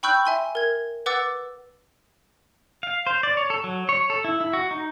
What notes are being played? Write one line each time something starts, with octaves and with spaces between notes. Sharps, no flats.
G5 B5 C#6 E6 F#6 G6
E5 G#5 C6
A#4 G#6
B4 F#5 D6 E6 A6
F5
C5
D5
C#5
A4
F#3
C#5
A4
E4
E4
F#4
D#4